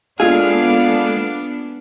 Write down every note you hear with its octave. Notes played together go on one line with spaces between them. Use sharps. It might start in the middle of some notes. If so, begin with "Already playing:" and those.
G#3 A#3 B3 D4 F4 G#4 A4 F5